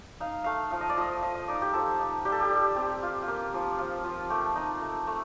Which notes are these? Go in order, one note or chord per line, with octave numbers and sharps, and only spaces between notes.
D#4 F5
A3 F5
F3 F5
D#5
D5
F3 D#5
F3 D#5
D#5
D#4 D5
G4
F3 A4
D#4
G3 G4
A4
G4
G3
C4 G4
F4
F4
A#3 G4
F3
F3 F4
F3
A3 G4
D#4
A3
A3